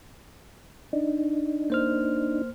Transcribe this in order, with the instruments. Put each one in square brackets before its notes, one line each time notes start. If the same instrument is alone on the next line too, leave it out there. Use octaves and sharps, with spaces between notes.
[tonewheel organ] D4 D#4
[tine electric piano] A#3 C5 F6